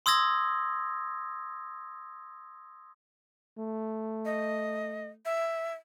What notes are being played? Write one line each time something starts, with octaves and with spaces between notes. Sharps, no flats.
C6 D#6 E6 G#6 A#6
A3
D#5
E5